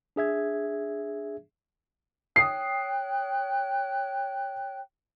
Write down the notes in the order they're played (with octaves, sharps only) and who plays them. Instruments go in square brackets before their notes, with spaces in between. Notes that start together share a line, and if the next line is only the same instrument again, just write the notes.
[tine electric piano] D4 G#4 E5 G#6
[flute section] C#5 G5 F#6 [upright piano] D#6 C7